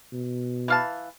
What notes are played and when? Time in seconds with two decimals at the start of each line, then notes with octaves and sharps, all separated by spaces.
0.12 B2
0.68 E3 F5 A5